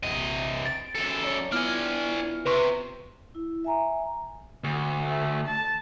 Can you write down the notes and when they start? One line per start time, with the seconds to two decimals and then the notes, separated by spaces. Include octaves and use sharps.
0.03 A#1 E2 C3 D#5
0.66 A6 D7
0.95 F#2 A4
1.22 C#5 D5 A#5
1.52 B3 D4 E4 F4 G#5 F6
2.46 C3 B4 C6 C#6
3.35 E4
3.64 E5 G#5 A#5
4.64 D2
5.03 A3
5.46 A5